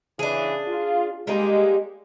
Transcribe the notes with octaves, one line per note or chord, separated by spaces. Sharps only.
C#3 E3 D4 G#4
F4
G3 G#3 A#3 D#4